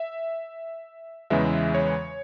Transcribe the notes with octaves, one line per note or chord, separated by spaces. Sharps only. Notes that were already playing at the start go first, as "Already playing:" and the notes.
Already playing: E5
E2 C#3 E3 G#3 E5
C#5